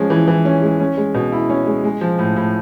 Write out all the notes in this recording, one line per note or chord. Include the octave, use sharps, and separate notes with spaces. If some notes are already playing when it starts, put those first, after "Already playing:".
Already playing: F3 G#3 C#4
E3
E3
C#4
G#3
C#4
G#3
B2
E4
C#4
G#3
G#3
F3
A2
A2